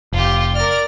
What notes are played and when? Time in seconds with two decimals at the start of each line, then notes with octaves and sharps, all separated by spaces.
0.13 F1 F4 G4
0.55 A#4 D5 F6